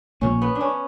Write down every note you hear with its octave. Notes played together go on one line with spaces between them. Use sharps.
A#1 A#2 A#3 C#4
B3
D4
C#4